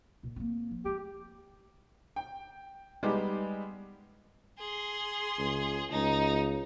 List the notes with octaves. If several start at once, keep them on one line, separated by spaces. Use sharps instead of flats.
A#2
A#3 C4
F3
G#3 G4
G5
G3 G#3 B3 D#4 G4
G#4 C6
C#2
C#2 D#4